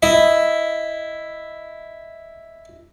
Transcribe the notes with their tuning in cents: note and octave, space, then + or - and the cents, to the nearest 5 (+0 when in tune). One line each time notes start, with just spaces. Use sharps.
E4 +0 D#5 +0